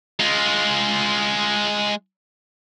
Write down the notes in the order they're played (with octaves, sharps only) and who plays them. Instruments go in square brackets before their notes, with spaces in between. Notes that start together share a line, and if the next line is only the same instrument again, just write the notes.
[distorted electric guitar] G#3 F4